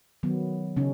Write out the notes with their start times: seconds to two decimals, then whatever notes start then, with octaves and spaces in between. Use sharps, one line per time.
0.23 D#3 F#3 B3
0.77 C#3 C#4 D#4